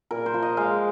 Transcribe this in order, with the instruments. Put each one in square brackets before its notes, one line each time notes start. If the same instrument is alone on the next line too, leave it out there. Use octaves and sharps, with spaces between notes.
[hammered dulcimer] A#2 A#4
C5
F3
D#5
G#3 F5